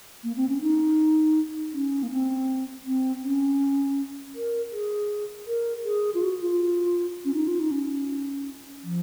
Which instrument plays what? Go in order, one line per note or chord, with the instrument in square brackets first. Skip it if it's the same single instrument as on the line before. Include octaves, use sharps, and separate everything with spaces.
[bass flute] A#3
C4
C#4
D#4
C#4
A#3
C4
C4
C#4
A#4
G#4
A#4
G#4
F4
F#4
F4
C#4
D#4
F4
D#4
C#4
F3